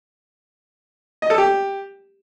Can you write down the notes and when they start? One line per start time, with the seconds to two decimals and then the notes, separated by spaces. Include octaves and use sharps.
1.22 D#5
1.30 A4
1.38 G4